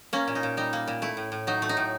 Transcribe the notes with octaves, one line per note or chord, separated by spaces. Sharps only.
A#3 C#4
A#2
D#4
A#2
G3 D#4
A#3
A#2
A3 E4
A2
A2
F#3 D#4
A3
D#4
A2